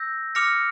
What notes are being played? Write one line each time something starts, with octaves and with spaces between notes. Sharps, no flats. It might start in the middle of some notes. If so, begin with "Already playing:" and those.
Already playing: E6 G6 A#6
D6 F6 A#6 C#7 F7